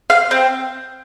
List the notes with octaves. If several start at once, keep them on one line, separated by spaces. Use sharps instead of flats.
F5
C4